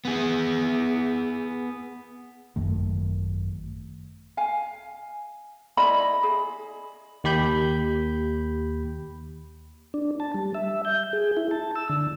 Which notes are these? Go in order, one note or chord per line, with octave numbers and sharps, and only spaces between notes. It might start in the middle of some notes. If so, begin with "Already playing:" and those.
B3 G#4
G#1 F#2 D#3 A3
F5 G#5
E4 D5 D#5 B5
G#4
D#2 G4 B5 G6
D4
A5
G3
E5
G6
G#4
E4
A5
E6
D3